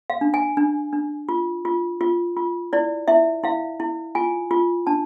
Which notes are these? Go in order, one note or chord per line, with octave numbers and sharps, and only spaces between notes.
F5
D4
G#5
D4
D4
F4
F4
F4
F4
E4 D5
E4 E5
E4 F5
E4
F4 G#5
F4
D4 A5